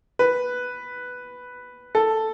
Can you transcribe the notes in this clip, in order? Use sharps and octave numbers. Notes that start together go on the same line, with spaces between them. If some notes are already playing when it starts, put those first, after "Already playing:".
B4
A4